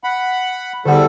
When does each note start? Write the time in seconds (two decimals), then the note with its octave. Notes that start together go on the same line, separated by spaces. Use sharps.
0.04 F#5 B5
0.86 E2 D3 G3 A4 F#5